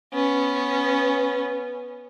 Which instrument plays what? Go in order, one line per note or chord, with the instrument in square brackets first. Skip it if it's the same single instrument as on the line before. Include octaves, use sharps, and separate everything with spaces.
[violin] B3 C#4